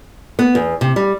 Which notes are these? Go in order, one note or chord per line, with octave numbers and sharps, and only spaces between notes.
B3
E2
C3
G3